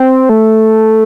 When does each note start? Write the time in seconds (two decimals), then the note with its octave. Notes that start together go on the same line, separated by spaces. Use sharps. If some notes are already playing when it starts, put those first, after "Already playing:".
Already playing: C4
0.29 A3